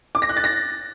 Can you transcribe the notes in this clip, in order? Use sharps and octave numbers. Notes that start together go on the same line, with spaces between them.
D6
A#6
F#6
A6
A#6